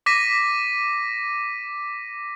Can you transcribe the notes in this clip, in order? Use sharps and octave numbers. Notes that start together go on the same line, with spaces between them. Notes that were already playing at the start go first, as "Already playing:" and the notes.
D6 A#6 B6 D#7